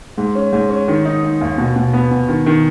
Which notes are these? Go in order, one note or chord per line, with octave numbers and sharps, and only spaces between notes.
G#2
C#4
G#2
C#4
D#3
D#4
D#4
D#2
B2
B2
B3
B2
D#3
D#3